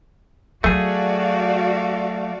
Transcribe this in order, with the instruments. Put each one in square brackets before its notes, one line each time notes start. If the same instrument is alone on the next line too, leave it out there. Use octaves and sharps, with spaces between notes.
[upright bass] F#3 [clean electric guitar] A3 G#4 [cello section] F#4 D5 F5